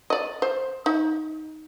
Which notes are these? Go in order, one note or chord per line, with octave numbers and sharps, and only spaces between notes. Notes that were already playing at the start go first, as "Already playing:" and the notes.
D5 D#5
C5
D#4